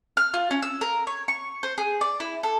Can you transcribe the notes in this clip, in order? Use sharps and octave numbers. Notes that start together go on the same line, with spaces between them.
F6
F4
C#4
E6
A#4
C#5
C#6
C5
G#4
D5
E4
A4